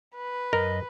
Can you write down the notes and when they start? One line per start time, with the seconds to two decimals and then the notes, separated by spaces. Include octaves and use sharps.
0.16 B4
0.53 F#2 A#4 D#5